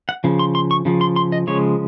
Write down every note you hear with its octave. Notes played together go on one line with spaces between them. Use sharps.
F#5
C#3 F3
C6
C6
C#6
C#3 F3
C6
C6
D#5
C#3 F3 G#3 C#5